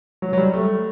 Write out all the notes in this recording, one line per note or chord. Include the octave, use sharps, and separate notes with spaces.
F#3
F#3
G3
A3